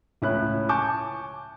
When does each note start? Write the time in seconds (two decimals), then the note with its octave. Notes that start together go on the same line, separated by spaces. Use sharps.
0.22 C#2 A2 C#4 B5 F#6
0.69 G#5 A5 C#6 D6 G6